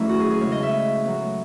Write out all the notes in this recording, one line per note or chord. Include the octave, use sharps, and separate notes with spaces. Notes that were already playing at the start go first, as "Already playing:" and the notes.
Already playing: E2 D#3 F#3 A3 C#4 E4
F#4
G#4
G#4
C#3 G#3 B3 C#5
D#5
E5
A2 F#3 B3